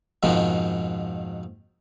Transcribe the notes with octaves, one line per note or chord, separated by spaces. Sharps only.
F2 G#2 B2 D#3 F3